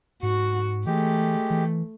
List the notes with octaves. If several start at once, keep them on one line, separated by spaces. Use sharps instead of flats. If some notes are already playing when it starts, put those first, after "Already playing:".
G#2 F#4
E3 G#3 A3 G4
E3